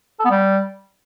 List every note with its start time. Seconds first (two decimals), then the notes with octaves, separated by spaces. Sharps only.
0.20 A4
0.25 B3
0.30 G3